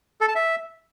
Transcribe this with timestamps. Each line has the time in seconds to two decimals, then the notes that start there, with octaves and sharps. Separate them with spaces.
0.21 A4
0.28 A5
0.35 E5